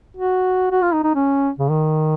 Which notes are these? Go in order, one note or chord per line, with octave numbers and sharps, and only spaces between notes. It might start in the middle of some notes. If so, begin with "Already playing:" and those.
F#4
F#4
F4
D#4
D#4
C#4
C#3
D#3